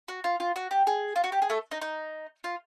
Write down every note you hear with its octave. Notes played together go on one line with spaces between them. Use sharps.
F#4
F4
F4
F#4
G4
G#4
F4
F#4
G4
G#4
A3 A4
D#4
D#4
F4